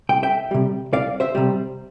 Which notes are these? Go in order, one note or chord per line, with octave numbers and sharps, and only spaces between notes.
C2 G5
E5 G5
C3 G3
C2 D5 F5
C5 E5
C3 G3